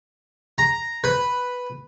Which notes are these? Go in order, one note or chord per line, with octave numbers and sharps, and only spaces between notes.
A#5
B4